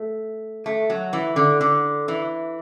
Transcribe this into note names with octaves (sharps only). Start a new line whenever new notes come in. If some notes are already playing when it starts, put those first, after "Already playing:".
Already playing: A3
A3
F#3
E3
D3
D3
E3